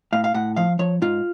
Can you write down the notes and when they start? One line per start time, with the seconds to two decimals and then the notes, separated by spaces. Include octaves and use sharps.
0.13 A2 F5
0.24 F5
0.34 A2 F#5
0.56 F3 F5
0.79 F3 C#5
1.02 G#2 F4